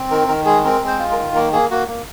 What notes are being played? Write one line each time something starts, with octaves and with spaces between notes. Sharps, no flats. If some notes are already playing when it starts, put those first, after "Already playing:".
Already playing: C4
D#3 A#4
D#3 A#4
G#3 G#4
C4 A#4
G#3
C5
F4
A#4
D#3
A#3 A#4
A#3 G#4
A#3 F#4
A#3